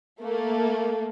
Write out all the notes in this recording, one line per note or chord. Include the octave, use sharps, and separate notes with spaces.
A3 A#3